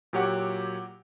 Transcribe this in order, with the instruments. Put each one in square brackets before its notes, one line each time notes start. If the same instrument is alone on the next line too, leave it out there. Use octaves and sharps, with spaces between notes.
[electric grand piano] A#2 F#3 G4 C#5 F#5 D6